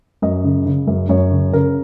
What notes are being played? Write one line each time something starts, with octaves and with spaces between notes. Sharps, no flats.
F#2 D#5
C#3
C#3
F#2
F#2 C#5
C#3
C#3 A#4